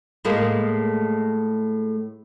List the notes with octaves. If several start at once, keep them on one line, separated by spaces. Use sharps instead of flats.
A2 G#3 A#3